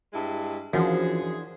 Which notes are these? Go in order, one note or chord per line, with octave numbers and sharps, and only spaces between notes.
G2 G#3 E4
F#2 E3 F3 D4 G#4 C5